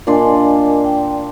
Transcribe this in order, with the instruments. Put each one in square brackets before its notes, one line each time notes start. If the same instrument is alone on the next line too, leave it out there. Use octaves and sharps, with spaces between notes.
[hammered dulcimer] A#2 D4 C6 [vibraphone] A#4 D#5 G#5
[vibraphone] G5